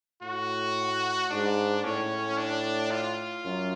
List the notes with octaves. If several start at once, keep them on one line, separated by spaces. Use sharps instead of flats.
A2 F#4
G#2 D4
A2 C#4
D4
F4
F#2